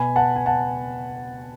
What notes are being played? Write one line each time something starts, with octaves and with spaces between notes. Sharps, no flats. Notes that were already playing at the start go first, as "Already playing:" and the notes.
Already playing: B2 G#5 B5
F#5 A5
G#5
F#5 A5